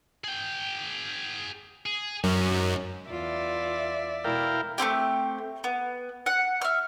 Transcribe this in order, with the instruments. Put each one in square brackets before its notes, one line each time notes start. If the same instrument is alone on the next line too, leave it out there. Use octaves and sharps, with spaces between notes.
[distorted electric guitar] G#4 G5
G#4
[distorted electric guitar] C2 C#4 [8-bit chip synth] F#2
[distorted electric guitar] G#2
[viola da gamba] E2 F4 [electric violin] D5 E5
[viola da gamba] B2 G#3 [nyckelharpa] E4 [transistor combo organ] A#4 F5 G5
[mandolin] A3 A#3 C4 G4
B3
F#5
E5 F6